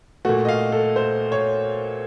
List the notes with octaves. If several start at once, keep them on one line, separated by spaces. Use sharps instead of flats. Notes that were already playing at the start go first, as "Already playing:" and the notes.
A#2 A3 F#4
D#5
F5
A4
C5
C#5